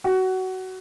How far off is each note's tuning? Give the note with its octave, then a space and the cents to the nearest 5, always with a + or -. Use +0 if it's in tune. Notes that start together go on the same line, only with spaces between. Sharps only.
F#4 +20